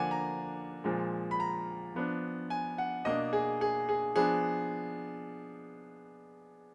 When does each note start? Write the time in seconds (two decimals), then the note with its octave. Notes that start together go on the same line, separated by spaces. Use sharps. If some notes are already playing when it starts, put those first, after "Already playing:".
Already playing: D3 F3 A#3 D4 F#5 G#5
0.11 A#5
0.84 A#2 F3 G#3
1.31 B5
1.40 A#5
1.95 F3 B3 D4
2.50 G#5
2.78 F#5
3.05 B2 A#3 D4 D#5
3.33 G#4
3.61 G#4
3.89 G#4
4.16 F3 B3 D4 G#4